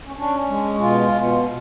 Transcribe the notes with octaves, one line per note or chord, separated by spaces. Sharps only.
C#4
C#4 D4
G#3
B2 F4
B2